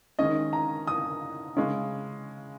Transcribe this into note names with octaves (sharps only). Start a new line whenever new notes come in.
D#3 G#3 C#4 D#5
A#5
D#6
C#3 G#3 C#4